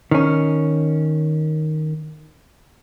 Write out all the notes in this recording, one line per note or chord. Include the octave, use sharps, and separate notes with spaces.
D#3 C#4